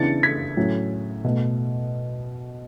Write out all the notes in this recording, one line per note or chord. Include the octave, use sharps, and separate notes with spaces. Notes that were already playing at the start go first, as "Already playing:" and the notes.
Already playing: C#3 E3 B3 D4 A6 C#7
G#6 B6
A2 F#3 C#4
B2 A3